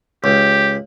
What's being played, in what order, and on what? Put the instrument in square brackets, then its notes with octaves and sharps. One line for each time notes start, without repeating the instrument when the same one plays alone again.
[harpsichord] C#2 [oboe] G4